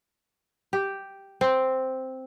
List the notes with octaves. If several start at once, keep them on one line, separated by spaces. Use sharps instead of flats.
G4
C4